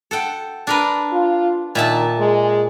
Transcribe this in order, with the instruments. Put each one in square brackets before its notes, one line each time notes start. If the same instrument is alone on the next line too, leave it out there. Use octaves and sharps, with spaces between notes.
[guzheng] A4 F#5 G5
D4 A#4 B4
[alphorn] F4
[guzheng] A#2 E5 A5 [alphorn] D#3
[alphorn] G#3